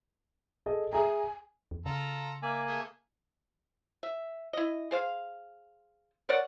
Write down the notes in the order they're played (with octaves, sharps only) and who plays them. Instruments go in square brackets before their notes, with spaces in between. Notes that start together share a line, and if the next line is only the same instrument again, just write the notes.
[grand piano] G#4 A4 D#5
[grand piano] G#4 E5 A#5 [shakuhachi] G#5
[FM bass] E2
[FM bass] C#3 [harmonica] F4 A4 A#5
[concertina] A#3 G#5 [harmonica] D5 E5
[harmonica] G#3 A3 G#4
[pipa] E5
E4 D#5
G#4 C5 F5
A#4 C#5 D5 F#5